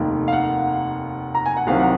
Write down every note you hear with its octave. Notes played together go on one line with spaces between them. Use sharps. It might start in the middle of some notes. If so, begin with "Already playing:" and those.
Already playing: F1 D#2 D#3
F5
F#5
A#5
G#5
F#5
C2 C3 D#3 F#3 C4 F5
F#5